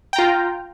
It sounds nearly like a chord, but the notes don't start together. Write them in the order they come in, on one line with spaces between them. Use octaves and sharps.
G5 A#5 F4